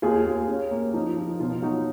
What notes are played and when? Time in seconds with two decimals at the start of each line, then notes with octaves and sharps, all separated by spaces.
0.02 D#2 F4 G#4
0.26 D#2
0.48 C#4
0.71 A#3
0.94 F3 D#4
1.17 F3
1.40 B2 F4
1.62 F#3 D#4 F#4